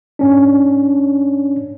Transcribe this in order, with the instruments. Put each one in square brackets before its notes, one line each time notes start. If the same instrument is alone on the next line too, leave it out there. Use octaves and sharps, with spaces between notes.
[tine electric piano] G#2 C#4 D4